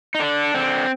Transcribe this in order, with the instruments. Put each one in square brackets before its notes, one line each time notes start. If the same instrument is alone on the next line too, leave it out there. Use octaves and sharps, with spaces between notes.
[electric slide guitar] D#4
D3 D4
D3 C4